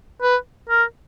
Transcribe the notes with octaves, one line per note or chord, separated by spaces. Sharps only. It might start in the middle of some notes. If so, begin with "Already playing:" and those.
B4
A#4